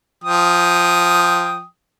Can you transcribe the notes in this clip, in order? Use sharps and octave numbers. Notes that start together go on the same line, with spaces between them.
F3 G5 D#6